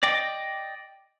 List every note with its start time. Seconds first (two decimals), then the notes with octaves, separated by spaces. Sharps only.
0.03 D5 D#5 G5 D6